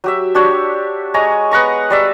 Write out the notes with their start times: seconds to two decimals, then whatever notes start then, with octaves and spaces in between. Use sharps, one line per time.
0.04 F#3 G4 E5
0.35 D4 F#4 G4 C#5
1.14 G#3 C#5 A#5 D#6
1.51 B3 F#5 A#5 C#6
1.90 G3 D5 E5